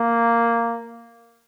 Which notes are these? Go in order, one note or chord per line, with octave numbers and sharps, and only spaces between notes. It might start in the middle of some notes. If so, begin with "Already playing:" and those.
Already playing: A#3